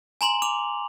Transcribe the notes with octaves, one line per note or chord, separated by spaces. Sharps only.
G#5 A#5 C6 F#7
D6 F7